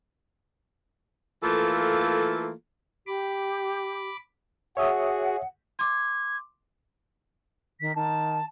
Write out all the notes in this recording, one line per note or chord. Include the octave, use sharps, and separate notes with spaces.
E3 A3 A#3 F4 A4
G4 B5 D6
F#4 G#4 C#5 E5 F#5 D#6
C6 D6 G#6
D#3 B6
D#3 A5